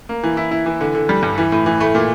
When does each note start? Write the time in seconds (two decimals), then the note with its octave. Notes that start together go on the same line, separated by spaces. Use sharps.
0.09 A#3
0.23 E3
0.37 E4
0.51 E4
0.66 E3
0.81 D3
0.95 D3
1.09 G3
1.23 G2
1.38 E3
1.52 A2
1.66 E3
1.80 A3
1.95 A#2